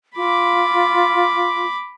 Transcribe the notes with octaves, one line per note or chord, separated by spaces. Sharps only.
F4 B5 D6